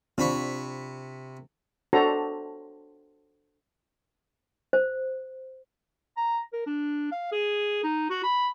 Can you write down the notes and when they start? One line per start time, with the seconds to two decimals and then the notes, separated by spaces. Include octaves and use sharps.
0.18 C3 C4 D4 F4 B5 C#6
1.93 D4 F#4 A4 C5 A#5
4.73 C5
6.17 A#5
6.53 A#4
6.66 D4
7.12 F5
7.32 G#4
7.83 D#4
8.10 F#4
8.23 B5